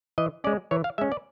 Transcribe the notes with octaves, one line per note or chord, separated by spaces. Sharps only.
E3 D#5
G#3 C#4 D5
E3 C#5
F5
G#3 C#4 E5
D5